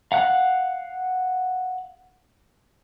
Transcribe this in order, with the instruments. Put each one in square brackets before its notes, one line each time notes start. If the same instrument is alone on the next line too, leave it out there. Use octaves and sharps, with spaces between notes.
[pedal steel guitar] F5 F#5 F#6